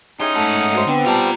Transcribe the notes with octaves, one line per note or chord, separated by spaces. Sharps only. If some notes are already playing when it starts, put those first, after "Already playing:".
C#4 D#4 E4 G4 G#4 C6
G#2 A3 A4 F#5
F#4 C5
D3 B3 C4
G3 F4 F#5 A5 A#5